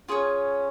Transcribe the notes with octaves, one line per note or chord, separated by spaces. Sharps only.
C#4 F4 G#4 C#5